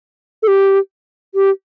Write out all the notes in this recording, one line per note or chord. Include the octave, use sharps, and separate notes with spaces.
A4
G4
G4